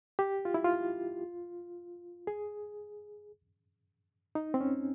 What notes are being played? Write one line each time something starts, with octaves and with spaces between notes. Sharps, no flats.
G4
F4
E4
F4
G#4
D#4
C4
C#4